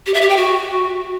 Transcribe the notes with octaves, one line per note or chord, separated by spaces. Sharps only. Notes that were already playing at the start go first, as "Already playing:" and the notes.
G4
E5
G4
G5
F#4